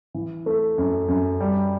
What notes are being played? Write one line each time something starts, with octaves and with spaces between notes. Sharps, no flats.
E3
A3
F#2
F#2
G3